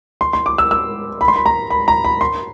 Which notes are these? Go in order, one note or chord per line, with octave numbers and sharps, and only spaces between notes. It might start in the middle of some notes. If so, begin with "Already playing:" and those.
C6
C6
D6
E6
E6
B5
C6
B5
A#5
B5
A#5
B5
C6